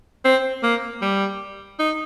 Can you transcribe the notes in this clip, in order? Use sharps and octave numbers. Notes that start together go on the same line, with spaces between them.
C4
A#3
G3
D#4